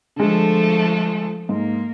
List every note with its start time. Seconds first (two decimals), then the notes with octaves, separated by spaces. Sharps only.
0.16 D3 F3 G#3 A3 A4
1.49 G#2 A#3